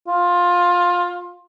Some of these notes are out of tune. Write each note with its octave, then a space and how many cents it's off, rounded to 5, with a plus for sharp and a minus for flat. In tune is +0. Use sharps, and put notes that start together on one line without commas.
F4 +15